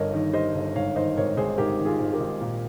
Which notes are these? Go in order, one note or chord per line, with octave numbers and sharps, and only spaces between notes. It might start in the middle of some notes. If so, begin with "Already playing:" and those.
Already playing: G1 G2 G3 A#4 C#5 D#5
D#3
G3 C5 D#5
G1
G#2 C#5 F5
D#3 C5 D#5
G#1 A#4 C#5
G#1 G#4 C5
G#2 G4 A#4
D#3
F4 G#4
G#1
G4 A#4
G#1
A#2